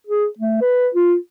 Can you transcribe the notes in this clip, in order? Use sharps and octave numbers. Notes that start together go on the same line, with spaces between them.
G#4
A3
B4
F4